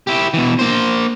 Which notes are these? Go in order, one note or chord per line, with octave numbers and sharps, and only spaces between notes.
E4 G4
B2 E3
A#3 C5